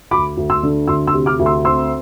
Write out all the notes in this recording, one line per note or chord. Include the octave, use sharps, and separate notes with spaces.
D2 B5 D6
D2
C6 E6
D3
D2 C6 E6
C6 E6
C3
D6 F6
D2
C6 E6
C4 C6 E6